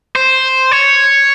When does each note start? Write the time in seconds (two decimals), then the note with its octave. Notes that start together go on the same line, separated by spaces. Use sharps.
0.16 C5
0.71 C#5